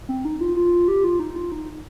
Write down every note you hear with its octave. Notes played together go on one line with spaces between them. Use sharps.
C4
D#4
F4
F4
G4
F4
D#4
F4
D#4